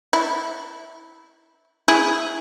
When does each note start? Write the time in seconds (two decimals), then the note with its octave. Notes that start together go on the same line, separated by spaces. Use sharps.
0.13 E4
1.88 E4 G#4